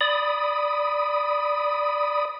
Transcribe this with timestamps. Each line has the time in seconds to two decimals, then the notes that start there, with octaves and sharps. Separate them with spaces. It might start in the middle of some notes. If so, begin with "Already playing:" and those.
0.01 D5 B5 D#6